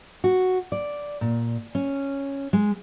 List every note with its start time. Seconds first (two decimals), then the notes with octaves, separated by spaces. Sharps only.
0.24 F#4
0.72 D5
1.21 A#2
1.75 C#4
2.53 G#3